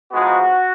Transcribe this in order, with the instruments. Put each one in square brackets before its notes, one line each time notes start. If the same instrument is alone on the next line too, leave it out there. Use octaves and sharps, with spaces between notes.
[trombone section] G#2 F3 G#3 B3 F#4